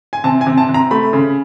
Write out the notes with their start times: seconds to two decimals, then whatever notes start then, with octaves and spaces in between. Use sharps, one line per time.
0.13 G#5
0.24 C3 A5
0.41 G#5
0.47 C3
0.58 A5
0.69 C3
0.74 A#5
0.91 A3 B5
1.13 C#3